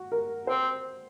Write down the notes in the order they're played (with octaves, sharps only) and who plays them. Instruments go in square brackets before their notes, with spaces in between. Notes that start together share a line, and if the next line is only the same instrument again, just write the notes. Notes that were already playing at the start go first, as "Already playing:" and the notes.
Already playing: [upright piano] F#4
A#4
[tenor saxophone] C4 [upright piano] C5